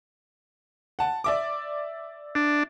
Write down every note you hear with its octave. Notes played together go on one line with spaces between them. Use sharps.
F#5 A5
D5 E5 D6
D4